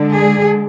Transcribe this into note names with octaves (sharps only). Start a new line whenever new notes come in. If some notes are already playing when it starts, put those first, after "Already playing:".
Already playing: D3 G#3 D4
G#4